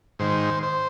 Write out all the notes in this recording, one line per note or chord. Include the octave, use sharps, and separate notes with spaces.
G#2 D#3 C5
C5